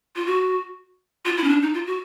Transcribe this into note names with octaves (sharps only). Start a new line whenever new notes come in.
F4
F#4
F4
E4
C#4
D4
D#4
F4
F#4